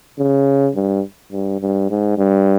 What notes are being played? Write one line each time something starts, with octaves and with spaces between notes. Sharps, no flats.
C#3
G2
G2
G2
G#2
G2